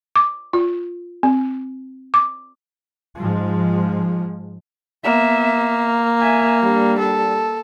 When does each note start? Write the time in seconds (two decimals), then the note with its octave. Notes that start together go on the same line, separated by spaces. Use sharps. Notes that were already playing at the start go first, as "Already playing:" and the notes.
0.16 D6
0.53 F4
1.23 C4
2.14 D6
3.17 G#2 F3 G#3
5.04 A#3 B3 E5
6.21 E5 G#5
6.62 G3 D4
6.99 A4